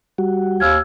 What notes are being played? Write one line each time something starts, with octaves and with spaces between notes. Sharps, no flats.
G3 F#4
D#2 E6 F6 G#6